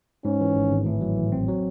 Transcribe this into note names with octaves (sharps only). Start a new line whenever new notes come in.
G#2 C#4
E3
G#1
G#1
A2 E3
F#3
A1
C4
F#3